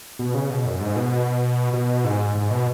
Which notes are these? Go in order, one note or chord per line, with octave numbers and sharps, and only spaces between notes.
B2
C#3
B2
F#2
G#2
B2
B2
G#2
G#2
B2